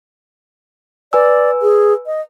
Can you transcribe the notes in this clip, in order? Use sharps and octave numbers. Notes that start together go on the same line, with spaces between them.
B4 D5 G#5 E6
G#4
D#5